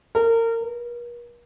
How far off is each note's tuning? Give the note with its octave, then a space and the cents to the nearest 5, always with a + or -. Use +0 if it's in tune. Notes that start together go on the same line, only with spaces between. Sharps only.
A#4 -30
A#4 +45